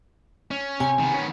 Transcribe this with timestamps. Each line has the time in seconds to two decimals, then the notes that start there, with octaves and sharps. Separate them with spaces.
0.51 C#4
0.80 C3 G#5
1.00 D#3 B3
1.14 C#4